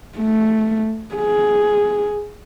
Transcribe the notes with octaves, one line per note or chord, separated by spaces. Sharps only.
A3
G#4